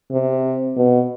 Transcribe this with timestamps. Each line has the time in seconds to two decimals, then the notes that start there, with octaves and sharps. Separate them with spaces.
0.12 C3
0.77 B2